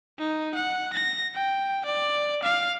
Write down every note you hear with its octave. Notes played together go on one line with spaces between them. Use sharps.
D#4
F#5
A#6
G5
D5
F5